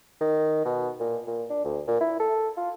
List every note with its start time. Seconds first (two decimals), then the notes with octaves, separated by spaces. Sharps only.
0.21 D#3
0.65 B2
0.99 A#2
1.27 A#2
1.50 D4
1.64 D2
1.88 A#2
2.01 E4
2.20 A4
2.57 F4